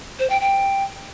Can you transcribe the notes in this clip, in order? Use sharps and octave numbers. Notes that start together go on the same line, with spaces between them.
C5
G5
G5